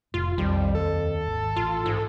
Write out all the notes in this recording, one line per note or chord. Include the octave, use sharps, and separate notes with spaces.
F1 A2 F4
B1 F2 D#3 G3
D#2 A4
G#1
A1 F4
G#2